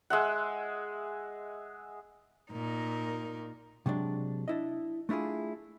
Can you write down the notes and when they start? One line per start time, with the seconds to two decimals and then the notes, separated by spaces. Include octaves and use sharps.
0.10 G#3 E5 F#5
2.51 A#2 D#4 A#4
3.86 C3 F#3 G#3 D4
4.48 D4 E4 D#5
5.09 A3 D4 E4 F4 G#4